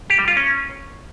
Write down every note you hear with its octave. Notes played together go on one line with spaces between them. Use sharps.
G4
G3
F4
C#4